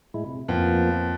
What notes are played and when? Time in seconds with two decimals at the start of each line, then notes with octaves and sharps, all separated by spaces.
0.14 A2 G#3 E4
0.26 C3
0.48 F2 F3 A#3 B3